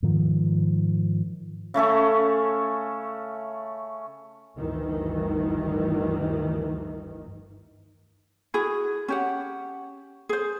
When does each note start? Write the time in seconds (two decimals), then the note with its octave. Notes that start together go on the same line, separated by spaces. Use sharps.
0.03 G#2 D#3 F3
1.74 C#3 A3 C#4 A4
4.57 G1 D2 G2 D#3 E3
8.54 E4 F#4 G#4
9.08 C#4 G4 F#5
10.29 G#4 C5